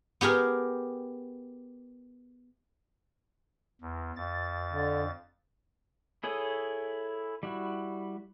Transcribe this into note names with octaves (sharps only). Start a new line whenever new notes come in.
B3 G4 G#4 A#4
E2
F2 A6
D3
E4 G#4 A4 C#5 D#6
G3 E4 F#4